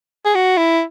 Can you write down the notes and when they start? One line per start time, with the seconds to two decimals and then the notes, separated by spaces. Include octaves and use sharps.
0.25 G#4
0.35 F#4
0.57 E4